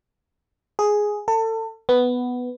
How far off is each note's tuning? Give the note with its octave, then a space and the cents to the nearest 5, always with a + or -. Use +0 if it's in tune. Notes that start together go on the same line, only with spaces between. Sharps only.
G#4 +5
A4 +30
B3 +5